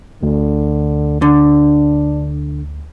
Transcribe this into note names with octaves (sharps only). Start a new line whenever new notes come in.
D2 D3
D3 D4